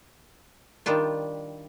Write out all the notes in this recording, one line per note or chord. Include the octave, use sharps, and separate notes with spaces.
D#3 G3 D4 F4